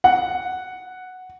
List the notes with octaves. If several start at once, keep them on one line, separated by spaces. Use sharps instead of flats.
F#5